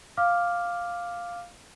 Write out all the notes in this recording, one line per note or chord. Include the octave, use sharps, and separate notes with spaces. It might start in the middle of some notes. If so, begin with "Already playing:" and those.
F5 D6 F6